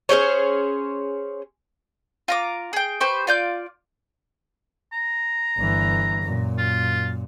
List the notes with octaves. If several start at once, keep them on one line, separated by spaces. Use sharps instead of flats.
C#4 G#4 C5 C#5
F4 A#5 D6
G#4 G5
G4 B4 C5 C#6
F4 D5 G6
A#5
G1 E3
F#2 A#2
F4